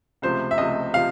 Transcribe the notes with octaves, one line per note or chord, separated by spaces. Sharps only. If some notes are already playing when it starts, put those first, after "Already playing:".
C#2 C3 F3 A3 C5
E5
C#2 C3 F3 A3 D#5
C3 F3 F5